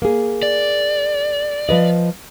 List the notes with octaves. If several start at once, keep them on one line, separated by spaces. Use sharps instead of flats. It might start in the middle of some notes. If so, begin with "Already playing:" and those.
A#3 G#4
D5
F3 B4 D#5